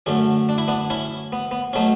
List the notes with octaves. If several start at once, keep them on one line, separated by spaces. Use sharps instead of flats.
F#2 D3 A3 C#4
D4
E4
B3 D4
C#4 E4
B3
B3
B2 F#3 A3 C#4